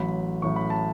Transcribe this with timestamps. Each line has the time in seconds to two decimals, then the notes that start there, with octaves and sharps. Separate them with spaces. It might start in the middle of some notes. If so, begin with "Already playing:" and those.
Already playing: A1 A2 F#3 B5
0.42 A1 A2 F#3 C#6
0.56 B5
0.70 A5